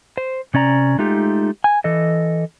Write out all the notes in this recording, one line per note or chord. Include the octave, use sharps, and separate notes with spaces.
C5
C3 C#4 D5 A#5
G#3 A3 D#4 F4 G4
G#5
E3 A4 D#5